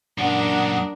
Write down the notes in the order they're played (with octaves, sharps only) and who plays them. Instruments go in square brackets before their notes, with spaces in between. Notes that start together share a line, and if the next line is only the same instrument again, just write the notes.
[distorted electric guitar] F#2 A#2 [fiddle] D4 A#4 [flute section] F#5 D#6